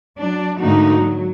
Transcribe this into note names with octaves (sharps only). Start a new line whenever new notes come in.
F#3 D4
G#2 D3 A3 A#3 D#4 F#4
F#3